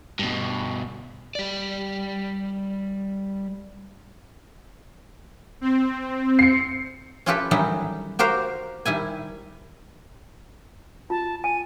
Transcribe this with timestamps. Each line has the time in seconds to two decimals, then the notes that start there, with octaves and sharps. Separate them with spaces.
0.19 G2 B2
1.35 G3 D5
5.61 C4
6.39 C7 C#7
7.26 C#4 E4 F4 G4 A4 B4
7.51 D#3 E3 F#3 G3 D#4 E4
8.19 F#4 G4 A#4 C5 F5
8.86 D#3 G3 E4 G#5
11.10 F4 A5
11.44 G#5 D#7